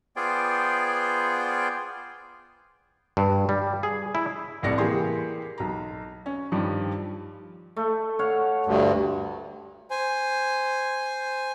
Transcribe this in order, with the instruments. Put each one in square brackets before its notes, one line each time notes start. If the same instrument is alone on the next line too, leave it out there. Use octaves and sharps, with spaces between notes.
[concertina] B3 F4 G#4 C5 D5 G5
[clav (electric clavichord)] G2
G3
G#4
E4
[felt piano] F1 C2 A2 D5 A#6 C#7
E3 A#3 G4 G#4 C6
B1 A#5
C#4
G2 D#3 F3 G3
[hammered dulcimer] A3
C#5 F5 F#5
[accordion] D2 G2
[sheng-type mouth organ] C5 G#5